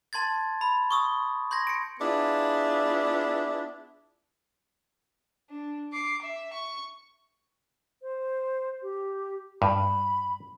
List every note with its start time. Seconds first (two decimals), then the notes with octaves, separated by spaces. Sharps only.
0.13 A5 C6 G#6 A6
0.61 B5
0.91 C#6 D#6 E6
1.51 C6 G6 G#6 A#6
1.67 C#7 D7
2.00 B3 D4 E4 F4 G#4
5.50 D4
5.93 D6 C7
6.22 E5
6.53 C#6
8.02 C5
8.82 G4
9.62 G2 B5